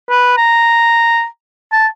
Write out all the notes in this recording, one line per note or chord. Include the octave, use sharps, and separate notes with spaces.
B4
A#5
A5